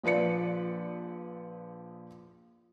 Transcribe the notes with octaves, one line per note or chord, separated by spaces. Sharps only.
A#1 F3 B4 D5 C#7